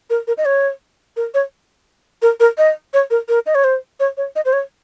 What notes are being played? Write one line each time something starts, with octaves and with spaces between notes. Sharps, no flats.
A#4
A#4
D#5
C#5
A#4
C#5
A#4
A#4
D#5
C#5
A#4
A#4
D#5
C#5
C5
C#5
C#5
D#5
C5
C#5